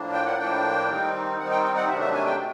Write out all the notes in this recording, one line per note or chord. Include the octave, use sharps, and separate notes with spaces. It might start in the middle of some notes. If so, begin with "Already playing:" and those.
Already playing: A2 F3 A#3 D4
G5
F#5
A2 F3 A#3 D4 G5
D#3 G3 C4 D#4
D#3 G3 C4 D#4 F#5
G5
G5
F#5
C3 D#3 F#3 A3 D4 E5
E5
G#5
G5